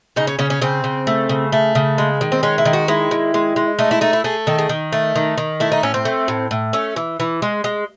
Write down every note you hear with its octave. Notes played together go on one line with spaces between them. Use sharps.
C#3 D#4
C#4
C#3 C#4
C#4
C#3 C4
C#3
A3
C#3
A3
C#3
G#3
D#3
C4
G#3 C#4
E4
D#3
F#4
G#3 E4
D#3
G#3
G#3
A3 D#4
E4
A3 D#4
E4
A3 G#4
D#3 A4
G#4
D#3
A3
D#3
D#3
A3 E4
D#4
A2 C#4
C4
A3
A2
A2
A3 C#4
E3
E3
G#3
G#3